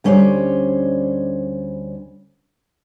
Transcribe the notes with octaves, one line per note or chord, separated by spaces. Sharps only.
D2 G3 C#4 D4 C5 C#5